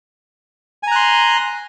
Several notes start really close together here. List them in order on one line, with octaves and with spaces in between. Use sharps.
G#5 A#5 F#6 C6